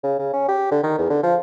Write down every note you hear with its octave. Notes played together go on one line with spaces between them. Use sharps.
C#3
C#3
C#4
G4
D3
D#3
E2
D3
F3